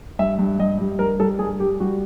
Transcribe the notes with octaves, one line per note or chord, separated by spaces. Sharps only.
G2 E5
G2
G2 D#5
G3
G2 A#4
G3 A4
G2 G#4
G3 G4
G3 F#4